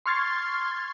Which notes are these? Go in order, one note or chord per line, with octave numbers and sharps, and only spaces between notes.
C6 C#6 F6 G#6 A6 C7